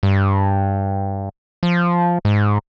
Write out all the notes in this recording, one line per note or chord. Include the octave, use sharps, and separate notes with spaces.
G2
F3
G#2